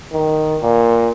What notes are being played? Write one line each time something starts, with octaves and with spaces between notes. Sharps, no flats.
D#3
A#2